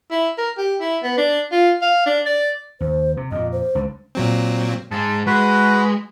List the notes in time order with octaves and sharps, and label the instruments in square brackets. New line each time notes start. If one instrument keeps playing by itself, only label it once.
[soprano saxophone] E4
A#4
G4
E4
B3
D4
F4
F5
D4
D5
[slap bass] D#2 [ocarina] C5
[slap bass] C3
[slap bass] F2 A#2 [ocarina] D#5
[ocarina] C5
[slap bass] C#2 D3
[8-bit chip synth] A#2 F#3 C4
[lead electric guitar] G#2 G#3 [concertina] A5
[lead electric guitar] G#3 [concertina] F#4 B4